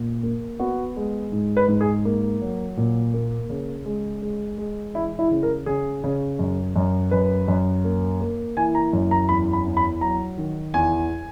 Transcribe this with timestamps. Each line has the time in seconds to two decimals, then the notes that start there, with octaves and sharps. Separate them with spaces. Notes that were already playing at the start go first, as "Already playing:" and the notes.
Already playing: A#2
0.23 A#3
0.59 B3 F#4
0.96 G#3
1.32 G#2
1.57 B4
1.68 G#2
1.81 G#4
2.05 A#3
2.42 F#3
2.77 A#2
3.14 A#3
3.50 C#3
3.85 G#3
4.22 G#3
4.58 G#3
4.94 E3 E4
5.19 E4
5.31 C#3
5.43 A#4
5.66 C#3 G#4
6.04 C#3
6.39 F#2
6.76 F#2
7.11 F#2 B4
7.48 F#2
7.84 A#3
8.21 A#3
8.57 E3 G#5
8.75 A#5
8.93 F#2
9.11 A#5
9.29 E2 B5
9.53 B5
9.66 E2
9.77 B5
10.01 F#3 A#5
10.38 D#3
10.74 E2 G#5